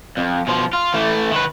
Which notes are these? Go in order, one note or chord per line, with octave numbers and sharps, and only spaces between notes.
F2
B2 F3
F4
E3 A3
D#3 B4